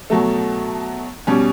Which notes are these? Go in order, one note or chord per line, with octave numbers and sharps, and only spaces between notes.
B2 F#3 A3
B2 G3 C#4